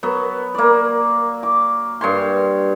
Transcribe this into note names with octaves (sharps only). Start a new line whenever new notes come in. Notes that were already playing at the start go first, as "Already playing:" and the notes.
F#3 B3
A#3 D5
D6
G2 C#5 C6